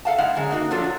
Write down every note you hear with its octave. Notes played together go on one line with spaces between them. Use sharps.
A4 A#4 F5 F#5 A5
G#3 E4 F5 F#5
F#2 D3 G#3
A#3 D#4 E4 F#4
F3 F#3 D4 F4 A4
F#3